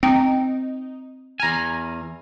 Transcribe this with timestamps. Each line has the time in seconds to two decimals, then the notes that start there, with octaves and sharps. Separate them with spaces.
0.03 C4 D#4 G5
1.40 E2 G#5 A#5 F6